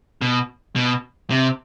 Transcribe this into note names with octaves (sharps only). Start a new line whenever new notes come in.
B2
B2
C3